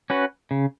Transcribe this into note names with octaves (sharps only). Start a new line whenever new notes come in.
C#4 F#4 B4
C#3